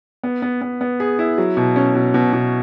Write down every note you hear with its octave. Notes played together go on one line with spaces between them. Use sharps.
B3
B3
B3
B3
G#4
E4
F#3
B2
C#4
B2
B2
B2